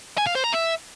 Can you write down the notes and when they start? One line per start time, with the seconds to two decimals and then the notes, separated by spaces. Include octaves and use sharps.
0.18 G#5
0.27 F5
0.35 C5
0.44 A#5
0.53 E5